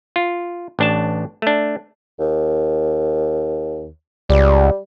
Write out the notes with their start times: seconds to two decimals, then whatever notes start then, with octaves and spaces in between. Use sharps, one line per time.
0.16 F4
0.79 A1 D4 A5
1.42 A3 D4
2.19 D#2
4.30 C#2 G3